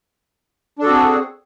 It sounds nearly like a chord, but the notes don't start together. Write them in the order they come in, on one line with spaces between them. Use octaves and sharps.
D4 A4 F#4 C4 G#4